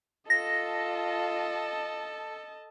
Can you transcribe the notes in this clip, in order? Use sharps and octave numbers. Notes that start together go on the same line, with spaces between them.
F4 A4 D#5 A5 A#6